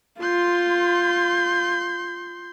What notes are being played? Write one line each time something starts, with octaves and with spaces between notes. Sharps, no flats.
F4 C6 G6